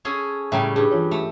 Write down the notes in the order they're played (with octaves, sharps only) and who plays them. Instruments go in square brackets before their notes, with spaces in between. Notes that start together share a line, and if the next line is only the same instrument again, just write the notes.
[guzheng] C#4 G#4 A4
[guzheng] A2 C#3 G3 [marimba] E5 G5 A#5
[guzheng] G2 [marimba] G4 G#4
[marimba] E3 F4 C#5
[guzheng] A3